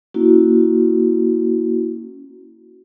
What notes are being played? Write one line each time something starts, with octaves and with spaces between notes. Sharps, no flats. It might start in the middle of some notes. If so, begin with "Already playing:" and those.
A#3 C#4 E4 F#4